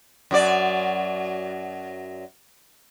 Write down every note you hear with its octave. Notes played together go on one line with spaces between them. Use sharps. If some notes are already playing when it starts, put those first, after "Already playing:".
F#2 F#3 D5